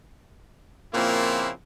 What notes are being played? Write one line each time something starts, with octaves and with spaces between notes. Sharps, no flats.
A#2 C#3 F3 A#3 C4 E4